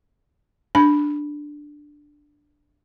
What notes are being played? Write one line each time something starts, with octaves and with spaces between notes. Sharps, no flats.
D4 B5